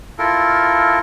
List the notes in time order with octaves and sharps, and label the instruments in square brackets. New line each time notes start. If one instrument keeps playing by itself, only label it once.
[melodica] E4 F4 A4 A#4